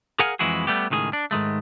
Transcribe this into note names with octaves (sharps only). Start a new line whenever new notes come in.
G#4 A#4 F5 F#5 G#5
F2 E3 G#3 E4 F#4 G#4
G3 A3 B3 G4
C#2 A2 D#3 F4 G#4
D4
G#2 D#3 G#3 A3